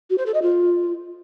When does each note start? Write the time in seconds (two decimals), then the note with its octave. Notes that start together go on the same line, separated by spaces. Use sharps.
0.10 F#4
0.18 C5
0.26 A4
0.34 D#5
0.42 F4